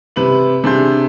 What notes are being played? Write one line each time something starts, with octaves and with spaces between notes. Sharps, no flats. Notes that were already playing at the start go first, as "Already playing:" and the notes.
C3 B4 F#7
C3 D4 G#4 C6 G6